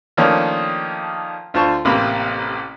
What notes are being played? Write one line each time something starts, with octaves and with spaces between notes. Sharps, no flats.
D#3 F3 A3 A#3 C#4 D4
D2 F4 C5 A5 C#6
A1 C3 A#3 C4 B5